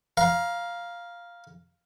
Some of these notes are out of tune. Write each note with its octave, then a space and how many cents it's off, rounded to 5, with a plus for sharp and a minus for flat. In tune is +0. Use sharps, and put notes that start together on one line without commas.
F5 +0 A#5 +25